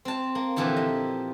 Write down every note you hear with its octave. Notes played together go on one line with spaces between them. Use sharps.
C4 A5
A#3
A#2 D3 E3 F3 G4 A5
D#5